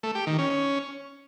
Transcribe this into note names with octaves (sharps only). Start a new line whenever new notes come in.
A3
G4
D#3
C#4
C#4